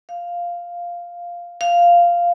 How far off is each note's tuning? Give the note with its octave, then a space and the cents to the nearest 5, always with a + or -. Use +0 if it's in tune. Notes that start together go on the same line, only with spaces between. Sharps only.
F5 +0
F5 -5